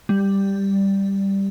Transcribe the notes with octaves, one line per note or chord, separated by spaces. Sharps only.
G3